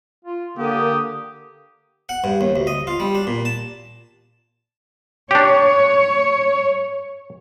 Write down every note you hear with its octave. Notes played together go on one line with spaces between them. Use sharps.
F4
D3 A#3 G4 D#6
F#5
G2
D#2
D2
D#5
F4
G3
D4
A#2
A5
D4 G4 C#5